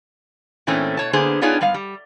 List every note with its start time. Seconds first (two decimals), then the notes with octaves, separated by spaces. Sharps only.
0.67 A#2 E3 A3 C4 C#4
0.97 B2 C#5 A5
1.13 D3 A#3 B3 G#4 C5
1.42 B3 D4 D#4 F4 G#4 C#5
1.61 G#2 G3 B3 F5
1.74 G3